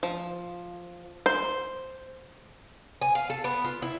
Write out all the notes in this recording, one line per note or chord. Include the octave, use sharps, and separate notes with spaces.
F3
C5
G#5
F5
A4
B3
F4
E4